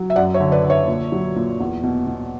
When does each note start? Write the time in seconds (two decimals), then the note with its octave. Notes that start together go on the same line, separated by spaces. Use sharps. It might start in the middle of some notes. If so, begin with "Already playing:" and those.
Already playing: F#3
0.10 E5
0.16 F#2 D5 F#5
0.34 C#5 E5
0.40 D3
0.52 B4 D5
0.65 D3
0.70 C#5 E5
0.87 A#2
1.12 F#3
1.36 A#2
1.60 E2
1.83 B2
2.07 B2